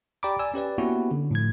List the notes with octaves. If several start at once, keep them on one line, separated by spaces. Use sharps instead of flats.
G4 D5 G5 A#5 B5 D6
D5 G#5 E6
C#4 G4 B4 D5
A#3 B3 C#4 E4 F#4 G4
D3
A2 F3 G#6